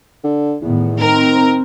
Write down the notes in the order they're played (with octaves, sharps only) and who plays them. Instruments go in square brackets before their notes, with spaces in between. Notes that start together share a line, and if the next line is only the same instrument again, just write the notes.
[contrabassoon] D3
[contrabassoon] E2 [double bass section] A2 D#3 B3
[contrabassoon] D#3 [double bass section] C4 [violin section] A#4